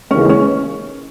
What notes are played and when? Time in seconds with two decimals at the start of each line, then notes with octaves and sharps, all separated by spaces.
0.11 D#2 C#3 E3 G#3 C#4
0.29 C#4